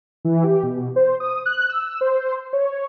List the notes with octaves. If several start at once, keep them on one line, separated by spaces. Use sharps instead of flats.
E3
G4
B2
C5
D#6
F#6
E6
C5
C#5